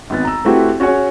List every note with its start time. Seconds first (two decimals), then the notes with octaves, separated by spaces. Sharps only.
0.10 G#1 B3 A6
0.25 A#5 E6
0.45 A3 C4 E4 F#4 G4 B4
0.80 C#4 F#4 G#4 C#5 G#5